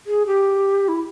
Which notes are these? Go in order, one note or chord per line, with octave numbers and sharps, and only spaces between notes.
G#4
G4
E4